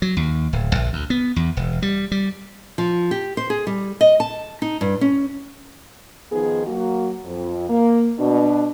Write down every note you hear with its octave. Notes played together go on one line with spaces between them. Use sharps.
F#3
D#2
D1
A#1
D2
B3
E2
E1
G3
G3
F3
G4
C5
G#4
G3
D#5
A5
D#4
G2
C#4
D#3 F3 B3 D#4 G#4
F#3 A#3 F#4
F2
A#3
B2 D4